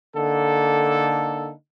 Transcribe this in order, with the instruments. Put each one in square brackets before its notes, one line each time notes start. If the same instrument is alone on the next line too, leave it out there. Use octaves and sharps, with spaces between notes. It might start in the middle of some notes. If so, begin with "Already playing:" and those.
[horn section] D3 A#3 D#4 A4